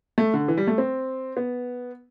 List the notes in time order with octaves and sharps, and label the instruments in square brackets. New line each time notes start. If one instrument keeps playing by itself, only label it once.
[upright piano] A3
D3
E3
G3
A3
C4
B3